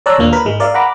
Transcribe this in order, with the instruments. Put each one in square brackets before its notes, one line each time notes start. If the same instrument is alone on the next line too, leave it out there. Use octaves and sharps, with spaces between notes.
[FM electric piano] C#5 D5 A5 A#5 E6 F#6
D#2 A#2 A#3 D4
A#4 B4 B5
G#2 G#3
A#4 D5 E5 F5
F#5 A#5 B5 D6